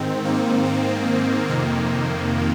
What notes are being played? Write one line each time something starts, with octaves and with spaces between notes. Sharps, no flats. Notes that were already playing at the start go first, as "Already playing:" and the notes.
Already playing: G#2 D#3 C4
A#3
C4
C4
F2 C3 D#3 A#3